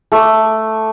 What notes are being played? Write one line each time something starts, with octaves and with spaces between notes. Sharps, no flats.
A3 D6